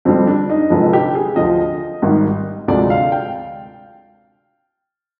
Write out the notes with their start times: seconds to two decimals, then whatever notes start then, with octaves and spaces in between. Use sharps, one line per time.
0.05 F2 D3 G3 C4
0.27 D4
0.50 D#4
0.70 F1 F2 D3 F3 G#3
0.93 G4
1.15 G#4
1.36 D2 D3 F3 D#5
2.02 G#1 G#2 G3
2.68 D2 C3 F3 G#3 D5
2.90 F5
3.12 G5